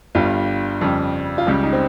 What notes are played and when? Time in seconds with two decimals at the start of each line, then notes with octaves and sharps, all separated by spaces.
0.15 G1 G2 G3 F4
0.81 F2 C#3 G3
1.38 F4
1.47 C#2 C#3 G3 G4
1.63 D#4
1.73 C4